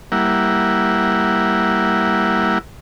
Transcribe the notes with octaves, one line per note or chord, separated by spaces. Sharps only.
G3 A#3 E4 F#5